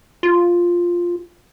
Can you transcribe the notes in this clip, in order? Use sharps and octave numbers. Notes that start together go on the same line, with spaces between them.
F4